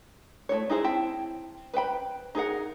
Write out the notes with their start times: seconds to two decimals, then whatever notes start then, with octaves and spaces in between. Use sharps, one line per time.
0.49 A3 C4 E4 C#5
0.70 D#4 E4 G#4 C5
0.84 C4 E4 G5 A5
1.74 B4 C5 G5 B5
2.35 D#4 G#4 A#4 F#5